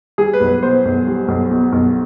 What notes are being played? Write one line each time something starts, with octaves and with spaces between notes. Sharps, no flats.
G3 G#4
B4
B1
B4
B2 C5
B1
G3
B1
B2
B1